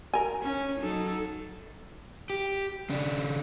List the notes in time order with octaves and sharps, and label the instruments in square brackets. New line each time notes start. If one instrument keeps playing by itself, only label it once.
[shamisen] A#4 G#5
[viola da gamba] C#4
F#3 D#4 A4
[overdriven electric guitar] G4
C#3 D4